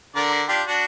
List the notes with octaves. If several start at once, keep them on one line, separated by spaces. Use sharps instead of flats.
D3 A#4 D5
D4 F4 G4
D4 F#4